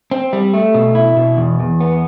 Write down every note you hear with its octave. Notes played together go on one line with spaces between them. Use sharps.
C4
G3
A3
B2
E4
B2
E2
E2
B3